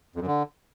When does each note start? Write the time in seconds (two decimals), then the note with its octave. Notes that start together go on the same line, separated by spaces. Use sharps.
0.16 F2
0.21 F#2
0.27 D3